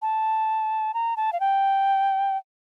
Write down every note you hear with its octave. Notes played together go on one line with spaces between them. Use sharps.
A5
A#5
A5
F5
G5